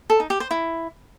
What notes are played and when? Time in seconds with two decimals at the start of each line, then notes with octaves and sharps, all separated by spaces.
0.10 A4
0.20 D#4
0.30 G4
0.40 C5
0.51 E4